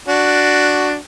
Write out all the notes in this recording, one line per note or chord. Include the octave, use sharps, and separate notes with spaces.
D4 F#4